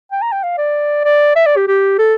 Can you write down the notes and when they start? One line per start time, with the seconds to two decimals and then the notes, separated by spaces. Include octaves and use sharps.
0.12 G5
0.22 A#5
0.32 G5
0.43 F5
0.58 D5
1.04 D5
1.36 E5
1.46 D5
1.57 G4
1.68 G4
1.98 A4